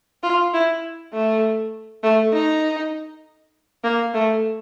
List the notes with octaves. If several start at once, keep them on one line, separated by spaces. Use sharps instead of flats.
F4
E4
A3
A3
D#4
A#3
A3